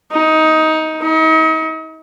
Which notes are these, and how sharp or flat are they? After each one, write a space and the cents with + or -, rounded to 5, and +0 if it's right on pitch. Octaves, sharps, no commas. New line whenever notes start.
D#4 +15
D#4 +40